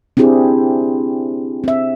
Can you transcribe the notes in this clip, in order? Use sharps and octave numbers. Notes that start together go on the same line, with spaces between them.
C4 D4 E4 G4 G#4
C4 E5